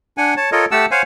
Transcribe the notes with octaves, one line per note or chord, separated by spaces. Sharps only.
D4 F#5 G#5
C#5 A5
F4 A4 A#4 C#5 D#5
A3 G4 F#5 A5 E6
C5 C#5 F5 F#5 G#5